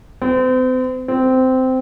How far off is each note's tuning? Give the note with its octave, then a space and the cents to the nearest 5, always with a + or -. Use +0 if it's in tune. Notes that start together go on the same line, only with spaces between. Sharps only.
C4 -40
C4 -15